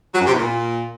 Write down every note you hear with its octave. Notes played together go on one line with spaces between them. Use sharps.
F#3
F#2
C3
E2
A#2